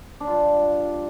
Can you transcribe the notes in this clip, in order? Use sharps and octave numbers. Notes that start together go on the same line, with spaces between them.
D4
G2 G3 F4